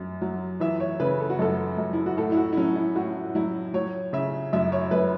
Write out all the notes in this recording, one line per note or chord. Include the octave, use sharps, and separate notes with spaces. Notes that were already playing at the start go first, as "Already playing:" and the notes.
Already playing: F#2
F#3
E3 E5
C#5
C#3 B4
A4
F#4
F#2 A4
F#2
E4
F#4
A2 A4
E4
F#4
E4
F#3 C#4
E4
A2 F#4
F#3 E4
F#3 C#5
C#3 E5
F#2 E5
C#5
F#2 B4